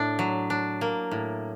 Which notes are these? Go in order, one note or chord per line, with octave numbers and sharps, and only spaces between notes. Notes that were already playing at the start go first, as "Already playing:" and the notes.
Already playing: A2 D4
F#3
D4
A#3
A2